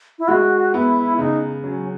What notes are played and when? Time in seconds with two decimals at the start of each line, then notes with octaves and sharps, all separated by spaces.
0.19 E4
0.28 G#3 F#4
0.73 B3 E4
1.18 C#3 D#4
1.64 F#3 C#4